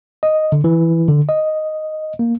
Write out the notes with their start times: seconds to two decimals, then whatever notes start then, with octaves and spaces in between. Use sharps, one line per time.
0.23 D#5
0.52 D3
0.64 E3
1.08 D3
1.29 D#5
2.19 A#3